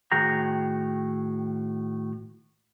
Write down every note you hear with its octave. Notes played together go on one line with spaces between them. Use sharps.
A2 D#3 F#4 G#4 G5 A#5